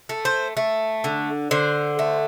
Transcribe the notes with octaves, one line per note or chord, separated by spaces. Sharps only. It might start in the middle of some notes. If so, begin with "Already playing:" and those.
A3
C5
A3
D3
D3 C5
A3